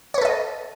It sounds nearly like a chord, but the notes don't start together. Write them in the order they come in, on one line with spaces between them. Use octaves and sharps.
C#5 B4 A4 D#5